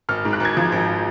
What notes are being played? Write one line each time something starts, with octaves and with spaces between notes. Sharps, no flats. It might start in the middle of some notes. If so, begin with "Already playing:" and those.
G#1 F6
G#2
F#6
G#1 G#6
F3
G#1